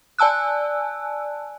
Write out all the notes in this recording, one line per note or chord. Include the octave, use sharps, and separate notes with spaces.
D5 G#5 A5 E6 F#6